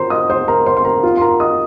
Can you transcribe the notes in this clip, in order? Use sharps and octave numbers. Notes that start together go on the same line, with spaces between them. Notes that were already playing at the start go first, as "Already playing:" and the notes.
Already playing: F4 A#4 C5 A#5 C6
D#5 D#6
C5 C6
A#4 A#5
C5 C6
C6
A#4 A#5
F4 F5
C6
A#4 A#5
D#5 D#6